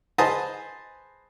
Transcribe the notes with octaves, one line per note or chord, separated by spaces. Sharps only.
G#4 B4 C5 D#5 A5 A#5